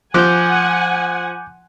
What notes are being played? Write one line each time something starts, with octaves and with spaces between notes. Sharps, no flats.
F3 F#5 G#5 D6 F#6 G6